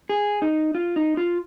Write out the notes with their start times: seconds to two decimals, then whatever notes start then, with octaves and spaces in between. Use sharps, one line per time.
0.09 G#4
0.42 D#4
0.75 F4
0.96 D#4
1.17 F4